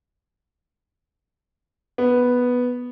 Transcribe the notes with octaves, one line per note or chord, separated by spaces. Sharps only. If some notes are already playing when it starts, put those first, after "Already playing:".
B3